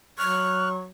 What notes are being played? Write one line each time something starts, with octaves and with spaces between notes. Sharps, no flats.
F#3 C#6 F6 F#6